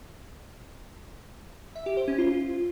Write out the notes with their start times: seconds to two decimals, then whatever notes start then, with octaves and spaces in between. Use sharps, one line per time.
1.75 E5
1.86 G4
1.97 C5
2.08 C#4
2.18 F4